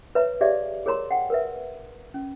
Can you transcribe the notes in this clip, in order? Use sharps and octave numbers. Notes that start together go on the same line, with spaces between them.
B4 C#5 E5 A#5
G4 G#4 C#5 D5 E5 F5
G#4 A#4 C#5 A#5 C6
F#5 G5
A#4 B4 E5
C#4